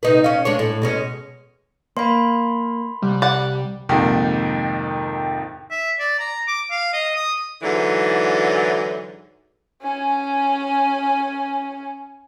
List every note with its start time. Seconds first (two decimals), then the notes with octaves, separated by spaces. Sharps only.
0.03 C3 D#4 B4
0.24 C#4 F5
0.45 G#3 D4 C#5
0.59 A2
0.82 B2 G#3 C#4
1.97 A#3 B5 C6
3.02 C2 G3
3.22 D5 F#5
3.89 F2 G#2 C3 D#3 A#3
5.71 E5
5.99 D5
6.19 A#5
6.47 D6
6.71 F5
6.93 D#5
7.16 D#6
7.63 G#2 D3 E3 F#3
9.82 C#4 G#5